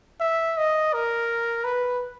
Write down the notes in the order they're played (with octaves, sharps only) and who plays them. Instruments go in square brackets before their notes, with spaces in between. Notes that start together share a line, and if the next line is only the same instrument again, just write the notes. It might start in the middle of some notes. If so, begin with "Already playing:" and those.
[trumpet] E5
D#5
A#4
B4